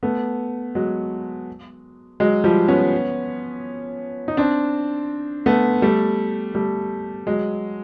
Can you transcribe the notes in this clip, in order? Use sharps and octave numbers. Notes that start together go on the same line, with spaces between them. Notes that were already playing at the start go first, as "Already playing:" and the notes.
A3 B3
F#3 G#3
F#3 G#3
F3 G3
B3 C#4
D#4
C4 D4
A3 B3
G3 A3
G3 A3
F#3 G#3